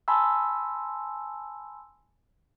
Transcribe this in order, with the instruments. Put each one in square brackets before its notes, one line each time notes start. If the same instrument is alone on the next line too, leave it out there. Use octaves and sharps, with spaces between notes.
[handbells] G#5 A5 B5 C6 E6